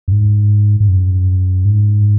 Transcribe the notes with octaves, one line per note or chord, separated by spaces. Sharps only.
F#2
G#2
G#2
F#2
G#2